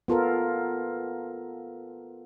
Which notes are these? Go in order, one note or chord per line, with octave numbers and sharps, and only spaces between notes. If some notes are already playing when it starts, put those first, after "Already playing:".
B3 F4 A4 A#4